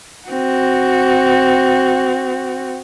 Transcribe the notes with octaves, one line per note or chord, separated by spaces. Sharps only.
C4 F#4